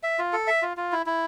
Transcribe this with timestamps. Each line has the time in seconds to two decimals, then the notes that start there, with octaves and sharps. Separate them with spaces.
0.03 E5
0.19 F4
0.33 A4
0.47 E5
0.62 F4
0.77 F4
0.92 E4
1.06 E4